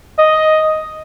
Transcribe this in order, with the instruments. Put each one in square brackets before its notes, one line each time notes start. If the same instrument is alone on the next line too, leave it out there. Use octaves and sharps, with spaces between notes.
[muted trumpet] D#5